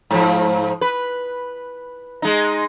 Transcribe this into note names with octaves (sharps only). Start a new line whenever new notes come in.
G#2 F3
B4
G#3 D#4